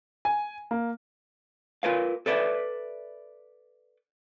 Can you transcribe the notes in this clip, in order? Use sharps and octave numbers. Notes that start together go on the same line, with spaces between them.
G#5
A#3
F4 A#4 B4 F5
A4 B4 D5 E5